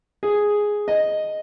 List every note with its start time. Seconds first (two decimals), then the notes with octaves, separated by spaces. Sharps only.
0.23 G#4
0.88 D#5